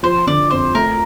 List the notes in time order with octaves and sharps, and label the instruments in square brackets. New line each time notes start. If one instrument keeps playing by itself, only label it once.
[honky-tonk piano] F3 [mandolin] C5
[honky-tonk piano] D3 [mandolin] D5
[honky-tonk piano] F2 [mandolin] C5
[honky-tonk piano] A3 [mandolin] A#4